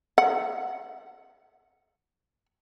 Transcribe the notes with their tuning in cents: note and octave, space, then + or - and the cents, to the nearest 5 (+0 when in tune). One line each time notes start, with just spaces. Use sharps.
F#5 -5